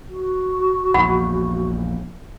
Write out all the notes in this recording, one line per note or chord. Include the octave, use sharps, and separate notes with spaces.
F#4
A#1 E2 F#5 B5